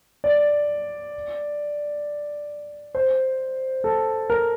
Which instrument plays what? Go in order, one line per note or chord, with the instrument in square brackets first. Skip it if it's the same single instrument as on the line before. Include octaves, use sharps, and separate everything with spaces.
[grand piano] D5
C5
A4
A#4